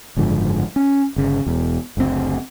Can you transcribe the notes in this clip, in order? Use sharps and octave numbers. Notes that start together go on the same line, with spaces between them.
F#1 G#2 D3 F3
C#4
G1 C#3
E1 E2
F#1 D2 A#2 C4